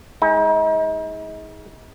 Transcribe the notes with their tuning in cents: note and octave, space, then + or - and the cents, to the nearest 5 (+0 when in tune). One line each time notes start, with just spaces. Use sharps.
G#3 +0 D#4 +40